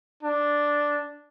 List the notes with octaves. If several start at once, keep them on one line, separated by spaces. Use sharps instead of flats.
D4